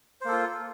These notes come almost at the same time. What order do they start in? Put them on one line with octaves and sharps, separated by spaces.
C5 A#3 A4 F4